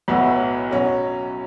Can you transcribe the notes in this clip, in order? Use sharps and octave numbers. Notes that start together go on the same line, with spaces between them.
B1 A2 F#3 B3 E4
B2 F#3 C#4